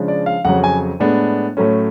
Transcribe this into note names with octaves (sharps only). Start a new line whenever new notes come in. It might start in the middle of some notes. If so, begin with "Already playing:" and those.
Already playing: C#3 F3 G#3 D4
D5
F5
F2 C#3 F#3 F#5
G#5
A2 G#3 B3 D4
A2 F#3 A3 C#4